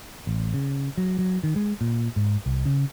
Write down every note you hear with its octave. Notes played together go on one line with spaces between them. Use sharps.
A1
C#3
F#3
F#3
D#3
G#3
A#2
G#2
C2
C#3